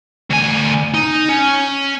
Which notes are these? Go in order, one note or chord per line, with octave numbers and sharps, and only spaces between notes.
D2 G#5
D#4
C#4